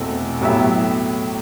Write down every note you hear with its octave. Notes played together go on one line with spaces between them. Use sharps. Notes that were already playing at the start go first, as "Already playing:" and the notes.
Already playing: E2 B2 A3 C4 E4
A2 F#3 B3 E4 G4